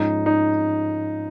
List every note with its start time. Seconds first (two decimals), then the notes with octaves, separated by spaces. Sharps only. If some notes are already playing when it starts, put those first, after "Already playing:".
Already playing: G#2 F3 G#3 C#4 D#4 G#4
0.26 D#4